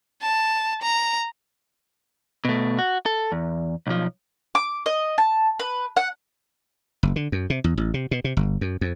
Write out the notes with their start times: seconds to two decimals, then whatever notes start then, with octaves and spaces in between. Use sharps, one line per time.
0.22 A5
0.82 A#5
2.45 B2 A3
2.79 F#4
3.06 A4
3.32 E2
3.87 B1 F3
4.55 D6
4.86 D#5
5.18 A5
5.60 B4
5.96 F#5
7.03 F#1
7.16 D3
7.32 F#2
7.50 C3
7.64 E2
7.77 A1
7.94 C3
8.11 B2
8.24 C3
8.37 G1
8.61 F#2
8.81 F2